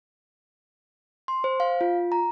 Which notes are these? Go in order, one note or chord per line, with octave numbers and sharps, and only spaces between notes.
C6
C5
F5
F4
A#5